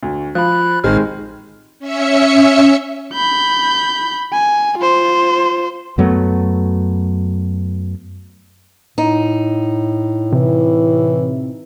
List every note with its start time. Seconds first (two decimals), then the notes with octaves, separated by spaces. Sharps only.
0.02 D2
0.35 F3 B5 F#6
0.84 A1 A2 D#3 G#3 C4 F6
1.79 C#4 E5 C#7
3.14 B5 G6
4.33 G#5
4.78 F4 C5
5.98 F#2 F#3 A3 B3
8.98 A2 D#4
10.33 C3 E3